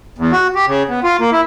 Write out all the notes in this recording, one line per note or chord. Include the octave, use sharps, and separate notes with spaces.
E2
F#4
G4
C#3
B3
F4
A#3
E4